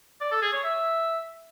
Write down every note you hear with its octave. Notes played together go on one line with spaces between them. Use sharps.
D5
A4
G#4
C#5
E5